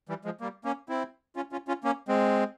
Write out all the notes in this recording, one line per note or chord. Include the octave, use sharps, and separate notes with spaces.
E3 G3
F3 G#3
G3 A#3
A#3 C#4
C4 E4
C#4 F4
C#4 F4
C#4 F4
A#3 C#4
G#3 C4